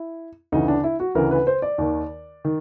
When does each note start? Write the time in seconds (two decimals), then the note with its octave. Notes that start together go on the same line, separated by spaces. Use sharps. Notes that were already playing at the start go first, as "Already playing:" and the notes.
Already playing: E4
0.52 D2 C#3 E3 D#4
0.68 D4
0.84 E4
1.00 F#4
1.15 D2 C#3 E3 A#4
1.31 B4
1.47 C5
1.62 D5
1.78 D#2 D#3
2.45 D#3